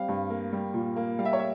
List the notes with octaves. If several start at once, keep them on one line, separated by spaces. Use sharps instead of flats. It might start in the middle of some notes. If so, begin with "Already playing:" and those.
Already playing: G3 C4 F5
G2
A#3
G3
A#2
A#3
G3 F5
E5
C#5
E5